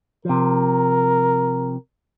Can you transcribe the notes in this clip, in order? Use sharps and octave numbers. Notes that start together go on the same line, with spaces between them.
C3 F3 A#4